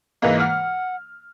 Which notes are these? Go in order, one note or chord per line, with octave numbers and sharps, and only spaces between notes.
G#2 E3 A#3 D#5
F#5 F6